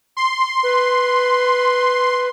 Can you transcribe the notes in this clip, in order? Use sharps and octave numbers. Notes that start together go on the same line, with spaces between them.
C6
B4